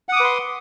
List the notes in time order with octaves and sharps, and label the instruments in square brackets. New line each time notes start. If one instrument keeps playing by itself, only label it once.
[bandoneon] F#5
D#6
D6
B4
C6